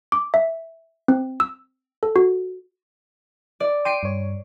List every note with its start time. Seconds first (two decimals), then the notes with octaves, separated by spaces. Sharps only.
0.12 D6
0.34 E5
1.08 C4
1.40 E6
2.03 A4
2.16 F#4
3.60 D5
3.85 G5 C6 D6 C7 D7 D#7
4.03 G2 C#5